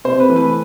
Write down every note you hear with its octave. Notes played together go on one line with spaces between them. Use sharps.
C3 C5
B4
E3 A3
B4